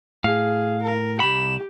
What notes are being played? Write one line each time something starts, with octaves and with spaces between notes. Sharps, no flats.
A2 G#4 F5
A#4
C2 G4 B5 E7